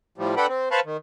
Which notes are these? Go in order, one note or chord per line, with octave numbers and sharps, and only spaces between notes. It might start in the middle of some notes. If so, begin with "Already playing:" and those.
A2 F3 G3
D4 A4 B4 F#5 G5 B5
C4
B4 C5 F5 A5 B5 C#6
D#3